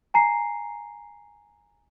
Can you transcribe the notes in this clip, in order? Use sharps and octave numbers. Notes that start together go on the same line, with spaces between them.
G#5 A#5 C7